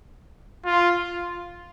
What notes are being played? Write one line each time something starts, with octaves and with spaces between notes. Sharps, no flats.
F4